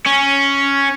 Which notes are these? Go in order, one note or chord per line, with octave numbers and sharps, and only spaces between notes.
C#4